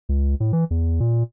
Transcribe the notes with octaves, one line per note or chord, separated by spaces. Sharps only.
C#2
A2
E3
E2
A#2